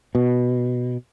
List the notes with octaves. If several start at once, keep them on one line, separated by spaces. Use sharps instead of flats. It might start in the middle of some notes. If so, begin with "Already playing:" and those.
B2